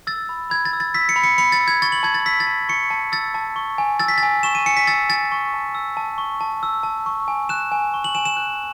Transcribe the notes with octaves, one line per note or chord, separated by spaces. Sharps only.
E6 A6
B5
B5 G#6
A6
E6
A6
E6 B6
C#7
B5
C#7
B5 C#7
A6
E6
G#6
C#6 A6
F#7
A5 G#6
A6
E6 B6
A6
A5
C#6 C#7
A5
E6 A6
A5
C#6
G#5
E6 A6
B6
G#5 A6
C#6 E7
D#7
G#5 C#7
B6
E6 A6
G#5 A6
C#6
A5
E6
A5
C#6
A5
E6
A5
C#6
G#5
F#6 E7
G#5
C#6
F#7
G#5 E7
E7
F#6